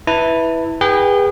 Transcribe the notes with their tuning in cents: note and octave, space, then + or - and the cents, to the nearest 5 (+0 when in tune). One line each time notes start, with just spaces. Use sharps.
E4 -10 B4 +0 A5 +25
G#4 -35 B4 -15 G5 -15